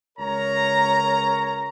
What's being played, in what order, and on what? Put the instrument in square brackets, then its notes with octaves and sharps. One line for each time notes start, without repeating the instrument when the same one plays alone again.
[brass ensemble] C#2 A#4 C#5 A#5